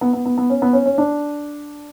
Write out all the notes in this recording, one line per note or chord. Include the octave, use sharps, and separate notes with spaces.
B3
B3
B3
B3
C#4
B3
C#4
C#4
D4